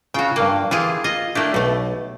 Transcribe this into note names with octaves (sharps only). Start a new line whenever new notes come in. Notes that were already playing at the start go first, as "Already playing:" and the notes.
C#3 F4 F#4 C#5 G5
G2 A#3 G5
E3 F4 G4 G#4
F4 D#5
A3 D4 E4 G4 A#4
B1 B2 A3